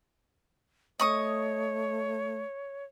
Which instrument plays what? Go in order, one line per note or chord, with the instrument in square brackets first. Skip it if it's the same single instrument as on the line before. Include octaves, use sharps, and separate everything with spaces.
[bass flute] A3 [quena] C#5 [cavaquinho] D#5 C#6 D#6